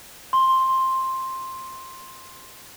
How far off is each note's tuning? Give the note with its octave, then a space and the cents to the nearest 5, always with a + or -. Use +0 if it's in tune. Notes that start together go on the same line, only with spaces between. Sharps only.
C6 +10